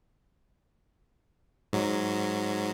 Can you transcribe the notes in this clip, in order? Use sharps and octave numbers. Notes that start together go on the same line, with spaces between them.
G#2 F#3